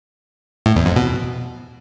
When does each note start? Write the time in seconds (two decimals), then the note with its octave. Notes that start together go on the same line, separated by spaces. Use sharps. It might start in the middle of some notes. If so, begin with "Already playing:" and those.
0.66 A2
0.76 E2
0.86 F2
0.96 B2